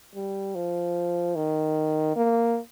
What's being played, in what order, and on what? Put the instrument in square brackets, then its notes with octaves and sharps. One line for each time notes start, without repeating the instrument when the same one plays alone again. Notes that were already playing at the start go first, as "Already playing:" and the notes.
[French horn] G3
F3
D#3
A#3